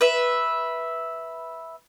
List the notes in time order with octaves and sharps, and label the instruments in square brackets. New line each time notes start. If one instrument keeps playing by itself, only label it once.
[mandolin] B4 E5